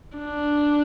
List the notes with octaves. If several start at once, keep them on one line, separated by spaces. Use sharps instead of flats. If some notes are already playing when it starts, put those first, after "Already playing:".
D4